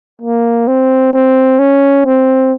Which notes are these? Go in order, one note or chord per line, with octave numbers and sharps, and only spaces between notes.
A#3
C4
C4
C#4
C4